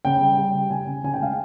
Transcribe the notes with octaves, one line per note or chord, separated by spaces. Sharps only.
C#3 G5
G3
G3 G5
C#3
C#3 G#5
C#3
C#3 G#5
G5
G#3 F5